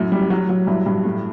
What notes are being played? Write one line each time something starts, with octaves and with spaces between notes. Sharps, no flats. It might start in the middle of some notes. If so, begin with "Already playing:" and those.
Already playing: F#2 A2
G3
F#3
F#3
G2 E4
G2
A2